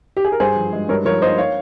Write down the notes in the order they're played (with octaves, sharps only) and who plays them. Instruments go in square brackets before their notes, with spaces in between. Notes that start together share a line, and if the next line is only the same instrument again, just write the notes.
[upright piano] G4
G#4
A#4
G2 G#4 C5
F3
G#3
G2 A#4 C#5
F3 A#4 C#5
A#3 C5 D#5
C#5 F5